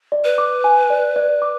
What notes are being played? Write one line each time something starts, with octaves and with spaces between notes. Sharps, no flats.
D5
B4
D6
G#5
D5
D5
D6